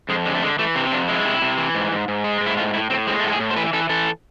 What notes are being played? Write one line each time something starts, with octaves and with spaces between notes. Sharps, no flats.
F2 G#3
D3 G#3
A3
D3 G#3
E3 A3
C3 C4
C4
F2 D4
G#3 E4
C3
C3
E3
G#2
G#2
G#2
G#3
G#2
E4
A2 F4
A2 E4
A2 C4
G#3 C4
A3
A2 A4
G#4
A2
C5
E3 B4
E3 A4
E3 A4